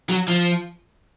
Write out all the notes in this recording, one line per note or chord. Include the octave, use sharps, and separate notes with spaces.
F#3
F3